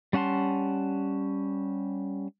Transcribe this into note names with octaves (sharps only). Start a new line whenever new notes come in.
G3 C#4 F#5 A5 C6